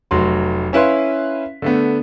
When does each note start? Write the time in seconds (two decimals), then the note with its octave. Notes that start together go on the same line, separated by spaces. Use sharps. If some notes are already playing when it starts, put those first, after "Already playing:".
0.11 F1 F#3 C6
0.73 C#4 E4 B4 F5 C6
1.62 D3 A3 B3